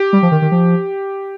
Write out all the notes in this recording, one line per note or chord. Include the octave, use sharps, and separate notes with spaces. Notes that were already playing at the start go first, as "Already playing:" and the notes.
Already playing: G4
G3
F3
D#3
D#3
F3